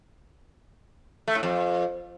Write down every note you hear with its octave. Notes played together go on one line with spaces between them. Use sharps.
A3
A2
F2